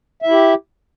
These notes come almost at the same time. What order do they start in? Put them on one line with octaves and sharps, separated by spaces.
E5 E4 G4